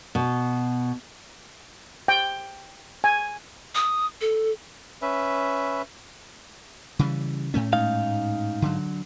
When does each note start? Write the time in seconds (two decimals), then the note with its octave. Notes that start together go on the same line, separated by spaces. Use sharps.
0.15 B2
2.08 G5
3.04 G#5
3.75 D#6
4.21 A4
5.02 C#4 B4 E5
6.99 C#3 E3 G3
7.54 A2 A3 C#4
7.73 G#2 D#4 F5
8.62 D3 F#3